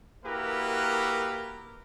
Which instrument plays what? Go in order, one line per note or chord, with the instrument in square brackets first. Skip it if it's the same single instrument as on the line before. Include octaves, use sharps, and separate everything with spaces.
[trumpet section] A#3 E4 F#4 G4 A#4 B4